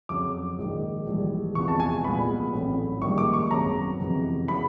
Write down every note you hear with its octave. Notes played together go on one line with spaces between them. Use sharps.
F2 C#3 F#3 D6
A#1 G#2 D#3
A#1 G#2 E3 G3
E2 C3 F3 G#3 B3 C#6
A5
G#5
C2 A#2 F3 G#3 B3 B5
A1 A2 F#3 A3 C4
A#1 G#2 D#3 G3 A#3 C#6
D6
C#6
G#1 F#2 C#3 F#3 B3 A#5
F2 C3 E3 G#3 B3
C#3 F#3 B3 B5